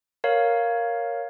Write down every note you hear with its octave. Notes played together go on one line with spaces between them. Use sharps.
A#4 C#5 F5